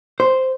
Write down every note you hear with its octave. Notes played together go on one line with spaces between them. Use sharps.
C5